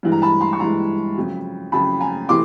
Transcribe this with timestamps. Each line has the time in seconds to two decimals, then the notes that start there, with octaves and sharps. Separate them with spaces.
0.03 G2 E3 G#3
0.12 A#5
0.22 A5 B5
0.41 A#5 C6
0.53 C#6
0.59 G2 E3 G#3 A#5 C6
1.16 F2 C#3 F#3
1.72 F2 C#3 F#3 A5 B5
2.00 G#5 A#5
2.29 C3 E3 A3 C6 D6